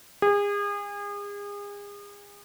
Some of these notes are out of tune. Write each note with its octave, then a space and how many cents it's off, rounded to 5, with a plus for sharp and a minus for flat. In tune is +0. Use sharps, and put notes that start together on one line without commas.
G#4 -35